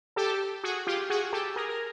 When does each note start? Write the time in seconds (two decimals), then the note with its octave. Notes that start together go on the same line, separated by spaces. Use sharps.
0.16 G4 A4
0.63 F#4 G#4
0.87 F4 G4
1.10 F#4 G#4
1.33 G4 A4
1.56 G#4 A#4
1.69 A#4